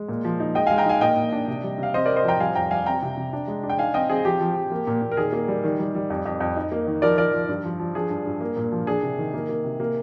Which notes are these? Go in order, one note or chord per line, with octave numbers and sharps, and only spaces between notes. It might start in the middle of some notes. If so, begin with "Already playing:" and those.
Already playing: G#3
A#2
F3
D#4
G#3 D#5 G5
G#3 F5 G#5
G5 A#5
D#4 F5 G#5
A#2 D#5 G5
A#2
D4
C3
G3
C3 F5
C4 C5 D#5
C4 A#4 D5
C5 D#5
F3 G5 A#5
G3 F5 G#5
F2 G5 A#5
G3 F5 G#5
C4 G5 A#5
C3
C3
D4
G#3
D4
G5
D#4 F5 G#5
C4 D#5 G5
C4 G#4
F3 G4
F3
F3
A#3
A#2
A#2
A#4
D#3 G#4
A#3
G3
D#3
G3
G3
F2
F2
F2
D#4
A#3
D#3
F3 A#4 D5
F3 A#4 D5
F3
G2
F3
F3
D4 G#4
G2
G2
A#3
A#2
F3
D4 G#4
C3
D#3
A#3
A#3
C3
A#3